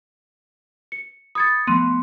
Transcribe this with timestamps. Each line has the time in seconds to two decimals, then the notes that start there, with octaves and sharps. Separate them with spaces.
0.92 C#7
1.35 B5 D#6 G#6 A6 C#7
1.67 F3 A3 B3 C6 D#7